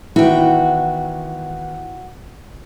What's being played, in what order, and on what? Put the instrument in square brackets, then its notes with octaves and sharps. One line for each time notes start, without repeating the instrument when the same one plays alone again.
[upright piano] D#3 E3 B3 [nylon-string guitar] E4 [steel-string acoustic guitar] F#4 G5